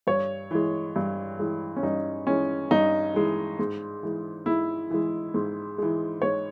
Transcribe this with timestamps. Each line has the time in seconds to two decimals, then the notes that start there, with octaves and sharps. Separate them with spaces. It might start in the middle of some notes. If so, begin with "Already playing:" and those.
0.07 G2 C#5
0.51 E3 G#3
0.96 G2
1.39 E3 G#3
1.76 C#4
1.83 G2 D#4
2.27 E3 G#3 C#4
2.71 G2 D#4
3.14 E3 G#3
3.59 G#2
4.03 E3 G#3
4.46 G#2 E4
4.90 E3 G#3
5.34 G#2
5.78 E3 G#3
6.22 G#2 C#5